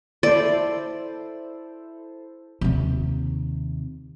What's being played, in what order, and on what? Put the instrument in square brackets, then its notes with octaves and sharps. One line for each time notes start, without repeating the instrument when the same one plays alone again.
[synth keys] E4 A4 C5 [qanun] D5
[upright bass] D#2 C3